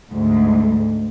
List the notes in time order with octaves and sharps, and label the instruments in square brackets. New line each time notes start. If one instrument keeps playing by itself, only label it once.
[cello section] D2 G#2